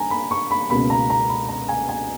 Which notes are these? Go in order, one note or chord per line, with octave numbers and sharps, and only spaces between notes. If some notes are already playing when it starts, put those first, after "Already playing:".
Already playing: G2 G#5 A#5
B5
C#6
B5
C#2 B2 A#3 B5
A#5
A#5
B5
A#5
G#5
G#5